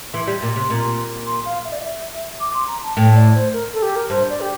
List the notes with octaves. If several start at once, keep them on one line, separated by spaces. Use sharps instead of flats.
E3 C6
G3
A#2
C3
A#2
C6
F5
E5
D5
E5
D6
C6
A#5
A5
A2 G5
D5
C5
A#4
A4
G4
A#4
G2 C5
D5
G4